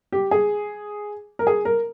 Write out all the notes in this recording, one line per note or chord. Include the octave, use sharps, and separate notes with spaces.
G4
G#4
A#4
G#4
A#4